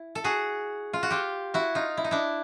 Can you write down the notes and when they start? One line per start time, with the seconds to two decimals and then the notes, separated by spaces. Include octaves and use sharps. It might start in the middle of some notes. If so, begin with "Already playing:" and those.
Already playing: E4
0.15 A4
0.24 F#4 G#4
0.93 F4
1.03 F#4
1.10 F4 G4
1.54 E4 F#4
1.75 D#4 F4
1.97 E4
2.04 D#4
2.11 D4 E4